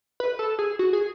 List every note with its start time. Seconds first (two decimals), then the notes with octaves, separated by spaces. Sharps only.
0.20 B4
0.39 A4
0.59 G#4
0.79 F#4
0.93 G#4